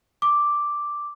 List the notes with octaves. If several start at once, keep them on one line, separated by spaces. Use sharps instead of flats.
D6